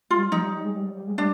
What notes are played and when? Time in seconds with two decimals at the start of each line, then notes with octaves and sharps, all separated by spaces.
0.11 F4
0.13 G#3
0.18 G3
0.31 F3 D#4
0.42 G3
0.53 G3
0.64 G#3
0.75 G3
0.85 G3
0.96 G3
1.07 G#3
1.17 G3 D4